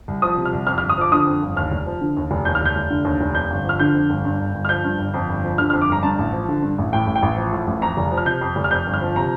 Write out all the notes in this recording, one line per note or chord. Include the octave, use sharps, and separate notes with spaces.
C2
F3 D#6
C3
F6
C2
F2 F6
F6
G1
D#6
F3 D6
D3 D#6
F2
G1
D#2 F6
F1
F3
D3
D#2
F1
D#2 G6
F6
F1 G6
F1
D3
D#2
F1
F2 G6
G1
F3 F6
D3 G6
F2
G1
G2
G1
G1
F6
F3 G6
G2
G1
F2
G1
F3
D3 F6
F6
F2
D6
G1 A#5
G2 A5
A1
F3
D3
G2
A1
A2 G5
A1
G5
A1
F3
A2
A1
F2 A#5
F1
F3
F6
C3 G6
F2
F1
F6
F2 G6
G1
F6
F3
C3 A#5